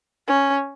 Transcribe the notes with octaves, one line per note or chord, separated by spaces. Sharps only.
C#4